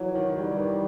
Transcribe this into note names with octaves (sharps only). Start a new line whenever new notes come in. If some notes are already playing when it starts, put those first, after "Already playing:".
Already playing: E3 F#3
D#3
D#3
E3 G3
E3
D#3